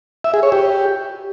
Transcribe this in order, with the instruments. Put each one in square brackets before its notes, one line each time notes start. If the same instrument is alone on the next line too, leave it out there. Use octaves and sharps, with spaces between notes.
[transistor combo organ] E5
G#4
C#5
G4